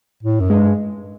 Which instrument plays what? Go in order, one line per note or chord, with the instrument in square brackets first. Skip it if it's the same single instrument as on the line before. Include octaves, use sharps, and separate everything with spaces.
[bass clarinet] A2
F#2
[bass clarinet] G2 [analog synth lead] G#3